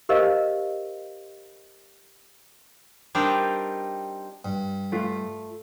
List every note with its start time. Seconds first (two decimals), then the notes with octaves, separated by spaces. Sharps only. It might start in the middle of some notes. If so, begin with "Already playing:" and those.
0.09 G4 A#4 C5 D#5 F5
3.15 G3 C4 D4 D#4 F4 A#4
4.45 G2
4.92 A3 F4